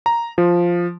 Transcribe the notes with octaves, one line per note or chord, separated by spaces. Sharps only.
A#5
F3